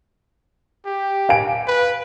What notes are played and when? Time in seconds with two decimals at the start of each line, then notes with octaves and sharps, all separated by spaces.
0.85 G4
1.29 F5 G#5 D7
1.67 B4